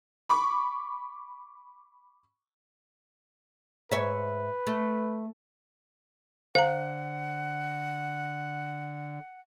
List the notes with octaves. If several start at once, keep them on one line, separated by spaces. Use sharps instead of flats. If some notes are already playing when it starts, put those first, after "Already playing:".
B5 C#6 D6
G#2 B4 C#5 E5
A3
D3 C5 F5 F#5 A#5